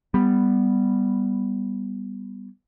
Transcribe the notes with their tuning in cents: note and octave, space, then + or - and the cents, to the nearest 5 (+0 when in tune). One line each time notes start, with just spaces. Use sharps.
G3 +10 B3 +0